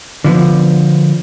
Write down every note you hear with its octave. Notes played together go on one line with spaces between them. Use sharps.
D3 F3 B3